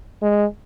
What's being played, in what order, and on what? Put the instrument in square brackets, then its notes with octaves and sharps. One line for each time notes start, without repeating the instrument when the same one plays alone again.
[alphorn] G#3